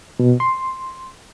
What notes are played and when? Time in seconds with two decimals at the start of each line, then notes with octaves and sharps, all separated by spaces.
0.19 B2
0.40 C6